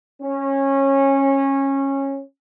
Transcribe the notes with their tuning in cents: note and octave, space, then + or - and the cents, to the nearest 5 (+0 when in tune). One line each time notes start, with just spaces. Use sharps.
C#4 -20